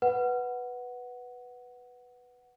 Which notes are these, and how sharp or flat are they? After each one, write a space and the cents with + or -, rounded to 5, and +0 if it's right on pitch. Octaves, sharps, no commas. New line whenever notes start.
B4 +0 F#5 +0